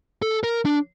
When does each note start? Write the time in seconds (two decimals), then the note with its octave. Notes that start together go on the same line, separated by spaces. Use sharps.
0.22 A4
0.44 A#4
0.66 D4